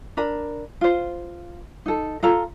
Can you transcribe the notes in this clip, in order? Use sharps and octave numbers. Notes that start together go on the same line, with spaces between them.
D4 A#4 B5
F4 C5
D#4 A4
F4 A4 A#5